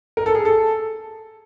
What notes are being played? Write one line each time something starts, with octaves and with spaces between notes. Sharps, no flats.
A#4
A4
G#4
A4